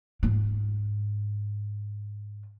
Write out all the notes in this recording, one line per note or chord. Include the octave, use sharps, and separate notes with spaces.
G#2 F4